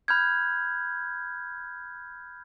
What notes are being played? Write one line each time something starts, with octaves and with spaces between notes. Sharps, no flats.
B5 F6 G6 G#6